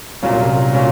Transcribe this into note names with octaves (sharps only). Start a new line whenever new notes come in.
C2 A#2 F#3 C#4 F4
A#2 F#3 C#4 F4